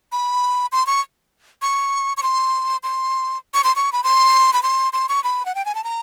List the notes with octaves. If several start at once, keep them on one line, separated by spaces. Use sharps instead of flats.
B5
C6
C#6
C#6
C#6
C6
C6
C#6
C6
C#6
B5
C6
B5
C6
C6
C#6
B5
F#5
G5
G#5
A5
A#5